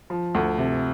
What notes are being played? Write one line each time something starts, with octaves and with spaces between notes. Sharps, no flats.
F3
D2
C3